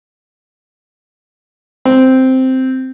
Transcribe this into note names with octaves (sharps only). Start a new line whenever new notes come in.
C4